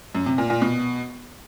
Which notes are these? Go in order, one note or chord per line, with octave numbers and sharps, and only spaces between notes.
F#2
C3
A#2
A#2
B2